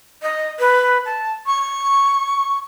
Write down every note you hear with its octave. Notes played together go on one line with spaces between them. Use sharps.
D#5
B4
A5
C#6